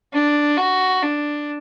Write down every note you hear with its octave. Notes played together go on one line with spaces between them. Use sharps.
D4
F#4
D4